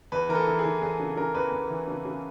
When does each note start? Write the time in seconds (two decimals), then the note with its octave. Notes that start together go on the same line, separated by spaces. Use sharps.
0.12 E2 B4
0.29 E3 A#4
0.35 A4
0.47 E3
0.59 G#4
0.65 E3
0.81 E2 G#4
1.00 C#3
1.17 C#3 A#4
1.34 E2 B4
1.52 E2
1.70 E3
1.88 C#3
2.05 C#3